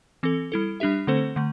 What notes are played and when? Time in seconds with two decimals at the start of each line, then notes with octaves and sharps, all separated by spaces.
0.23 E3 C4 A4
0.52 G3 E4 A4
0.80 G3 D4 G4 E5
1.07 D3 A3 C4 A4 C5
1.36 D3 A3